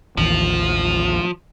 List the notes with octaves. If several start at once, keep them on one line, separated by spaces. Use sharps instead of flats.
A1 D#2 E3 F3